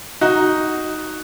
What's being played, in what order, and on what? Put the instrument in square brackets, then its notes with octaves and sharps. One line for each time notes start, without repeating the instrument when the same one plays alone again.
[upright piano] D#4 F#4